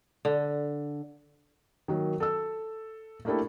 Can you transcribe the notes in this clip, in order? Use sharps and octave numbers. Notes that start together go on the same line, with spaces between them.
D3
D#3 F#3 A#3
A4 E6
A3 A#3 D4 E4 G4 A4